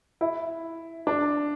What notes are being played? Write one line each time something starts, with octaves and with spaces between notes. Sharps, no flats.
E4
D4